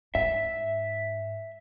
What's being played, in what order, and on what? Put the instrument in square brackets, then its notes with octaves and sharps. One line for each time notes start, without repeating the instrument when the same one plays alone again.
[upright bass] G#2 [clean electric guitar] E5